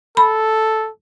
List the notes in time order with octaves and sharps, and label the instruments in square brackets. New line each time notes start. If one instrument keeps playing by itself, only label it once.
[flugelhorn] A4 [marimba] B5